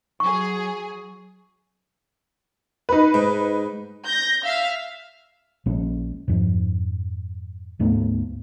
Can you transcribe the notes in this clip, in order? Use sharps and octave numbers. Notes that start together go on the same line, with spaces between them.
F#3 G#4 C#6
D#4 B4
G#2
G6 A#6
E5 F5
A#1 A#2 G#3 C#4
F2 G#2
D1 G#2 A3 B3